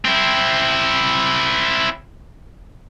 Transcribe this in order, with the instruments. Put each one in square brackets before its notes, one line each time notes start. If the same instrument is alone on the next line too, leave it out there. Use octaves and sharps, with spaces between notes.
[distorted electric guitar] C4 E4